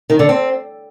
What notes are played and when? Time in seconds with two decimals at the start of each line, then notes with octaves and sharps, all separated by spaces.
0.10 D#3
0.19 D3
0.29 C4